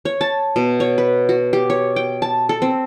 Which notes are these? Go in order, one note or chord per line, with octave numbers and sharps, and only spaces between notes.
C#5
A5
B2
C#5
B4
F#4
G4
C#5
G5
A5
A4
C4